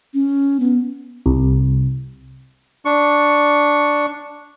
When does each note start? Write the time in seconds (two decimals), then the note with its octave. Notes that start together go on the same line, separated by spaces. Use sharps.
0.14 C#4
0.60 B3
1.26 C2
2.85 D4 C#6